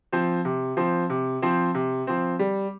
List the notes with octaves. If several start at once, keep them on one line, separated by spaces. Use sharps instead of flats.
F3 C4
C3
F3 C4
C3
F3 C4
C3
F3 C4
G3